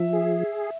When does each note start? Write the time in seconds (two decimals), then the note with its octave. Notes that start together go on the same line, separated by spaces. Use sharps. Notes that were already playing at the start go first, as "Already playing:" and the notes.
Already playing: F3 E5
0.13 G#4